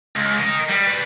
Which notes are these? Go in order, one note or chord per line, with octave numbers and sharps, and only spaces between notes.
C#2
A#4 D#5
G3
B4 D5